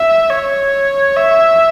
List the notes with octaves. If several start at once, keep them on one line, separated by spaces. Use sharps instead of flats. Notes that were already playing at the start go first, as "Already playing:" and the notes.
Already playing: E5
C#5
E5